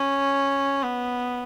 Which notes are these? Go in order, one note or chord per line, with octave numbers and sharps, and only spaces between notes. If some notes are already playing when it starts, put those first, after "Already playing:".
Already playing: C#4
B3